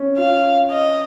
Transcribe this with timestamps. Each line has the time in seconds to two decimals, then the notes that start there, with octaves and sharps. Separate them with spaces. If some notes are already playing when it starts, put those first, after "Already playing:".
Already playing: C4 C#4
0.18 F4 F5
0.71 D#5